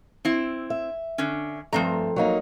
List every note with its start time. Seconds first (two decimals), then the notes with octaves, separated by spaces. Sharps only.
0.25 C4 E4
0.70 E5
1.18 D3 C#4
1.73 G2 F3 A3 C4 A#5
2.16 F#3 A#3 D#4